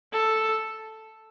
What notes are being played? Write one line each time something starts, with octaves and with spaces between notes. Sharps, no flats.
A4